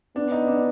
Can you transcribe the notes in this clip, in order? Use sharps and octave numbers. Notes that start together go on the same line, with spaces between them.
B3 D4
D#4
D4